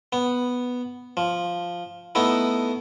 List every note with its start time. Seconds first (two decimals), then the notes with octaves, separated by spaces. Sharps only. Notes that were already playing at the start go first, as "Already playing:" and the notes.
0.13 B3
1.17 F3
2.15 A3 B3 D#4 E4